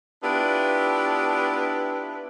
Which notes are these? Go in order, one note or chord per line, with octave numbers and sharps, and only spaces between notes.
B3 D4 E4 F4 G4 B4